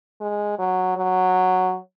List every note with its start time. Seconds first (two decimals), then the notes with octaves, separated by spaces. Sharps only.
0.21 G#3
0.59 F#3
0.97 F#3